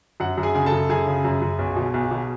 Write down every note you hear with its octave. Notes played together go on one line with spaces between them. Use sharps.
F#2 F#5
F#2
G#4 G#5
C#3 G#5
A4 A5
F#2
F#2 G#4 G#5
C#3
F#2
F#2
B1
B2
B1
B2